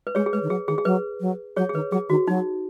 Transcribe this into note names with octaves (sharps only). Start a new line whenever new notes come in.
B4
G#3 G#4 C#5
G#4
G#3 B4
D#3
F#3 G#4
D#3 G#4
G#4
F#3 B4
F#3
F#3 G#4 C#5
G#4
D#3 B4
F#3 G#4
D#3 F#4
F#3 D#4